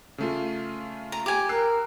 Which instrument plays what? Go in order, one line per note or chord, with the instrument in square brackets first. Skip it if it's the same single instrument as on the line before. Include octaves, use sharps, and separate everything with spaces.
[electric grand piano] C#3 A3 F4
[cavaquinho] A#5
G4 G#5
[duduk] A#4 [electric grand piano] E6 F#6 C7